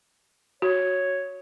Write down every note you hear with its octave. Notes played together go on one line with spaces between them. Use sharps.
F#4 C#5